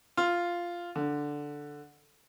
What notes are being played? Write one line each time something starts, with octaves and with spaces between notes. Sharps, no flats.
F4
D3